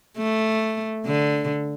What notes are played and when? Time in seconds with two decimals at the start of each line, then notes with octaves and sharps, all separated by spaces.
0.18 A3
1.06 D3